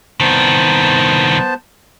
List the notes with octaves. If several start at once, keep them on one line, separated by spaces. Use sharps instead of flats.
C2 D#3 B3 C5 A5